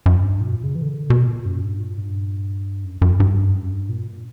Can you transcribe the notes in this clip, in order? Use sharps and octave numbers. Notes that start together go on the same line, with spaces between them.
F#2
G2
A#2
B2
A#2
C#3
E3
D3
C#3
D3
B2
A#2
F#2
G2
A#2
G2
F#2
F#2
G2
F#2
G2
A#2